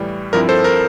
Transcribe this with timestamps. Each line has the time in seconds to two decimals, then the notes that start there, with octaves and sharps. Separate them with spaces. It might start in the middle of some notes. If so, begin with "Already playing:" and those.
Already playing: A2 E3 G3
0.33 G2 F3 C4 E4 A#4
0.49 A4 C5
0.64 A#4